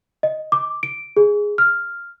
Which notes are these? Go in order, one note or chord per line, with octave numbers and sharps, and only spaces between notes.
D#5
D6
D7
G#4
F6